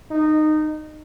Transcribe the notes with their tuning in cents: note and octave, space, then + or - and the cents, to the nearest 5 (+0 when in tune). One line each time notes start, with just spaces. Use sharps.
D#4 -20